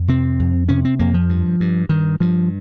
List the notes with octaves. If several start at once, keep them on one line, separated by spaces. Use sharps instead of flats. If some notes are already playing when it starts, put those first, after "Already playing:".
Already playing: F2
C3 C4
F2
C3 C#4
C4
F2 A#3
F3
G2
G2
G2 D#3
G2 F3